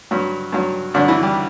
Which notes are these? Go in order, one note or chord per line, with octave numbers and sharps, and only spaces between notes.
G2 F#3
G2 F#3
G2 D3 F#3 D4
E3 E4
G3 G4